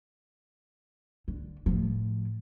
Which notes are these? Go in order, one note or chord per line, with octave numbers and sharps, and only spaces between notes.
D3
A2 F3